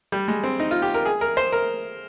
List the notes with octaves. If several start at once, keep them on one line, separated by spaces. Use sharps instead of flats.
G3
G#3
C4
D#4
F4
G4
A#4
G#4
A#4
C5
A#4